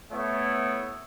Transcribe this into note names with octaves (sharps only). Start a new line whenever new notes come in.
A3 B3 E4 C#5